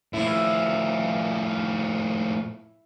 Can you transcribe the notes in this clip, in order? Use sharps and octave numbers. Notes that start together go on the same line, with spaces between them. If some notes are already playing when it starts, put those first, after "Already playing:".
A2 F3 E4